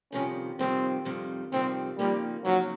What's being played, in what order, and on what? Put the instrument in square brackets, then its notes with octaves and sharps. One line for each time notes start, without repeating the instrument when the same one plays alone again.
[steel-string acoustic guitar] F2 C3 D#3 G3 [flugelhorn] C#4
[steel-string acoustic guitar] F2 C3 D#3 G3 [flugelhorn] C4
[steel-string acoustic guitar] F2 C3 D#3 G3
[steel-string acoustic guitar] F2 C3 D#3 G3 [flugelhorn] C4
[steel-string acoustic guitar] F2 C#3 F3 A#3 D#4 [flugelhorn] G3
[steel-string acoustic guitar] F2 C#3 F3 A#3 D#4 [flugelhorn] F#3